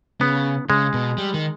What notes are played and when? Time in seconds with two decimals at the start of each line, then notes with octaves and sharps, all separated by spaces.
0.21 C#3 B3
0.69 C#3 G#3
0.94 B2
1.18 G3
1.34 D#3